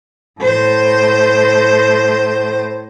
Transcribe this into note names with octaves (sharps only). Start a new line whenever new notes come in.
A2 C5